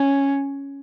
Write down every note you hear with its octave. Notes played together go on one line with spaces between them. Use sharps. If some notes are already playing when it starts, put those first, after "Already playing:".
Already playing: C#4